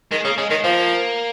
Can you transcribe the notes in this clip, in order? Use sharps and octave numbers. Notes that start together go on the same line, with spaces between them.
D#3 G#3
C#3 A#3
C#3 G#3
D#3 G#3
F3 A#3